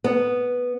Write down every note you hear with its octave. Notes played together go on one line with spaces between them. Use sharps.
B3